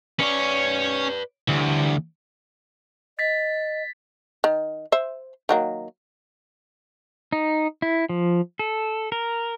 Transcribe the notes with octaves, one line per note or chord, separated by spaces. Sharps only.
C#4 B4 C#5 D5
D2 E3 G3
D#5 A6 B6
D#3
C5 E5
D#3 F#3 A#3
D#4
E4
F3
A4
A#4